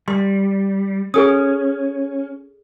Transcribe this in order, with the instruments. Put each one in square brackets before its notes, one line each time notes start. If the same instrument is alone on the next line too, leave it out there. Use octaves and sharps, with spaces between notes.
[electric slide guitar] G3 [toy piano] C6
[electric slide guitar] C#4 [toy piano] G#4 A4 D#6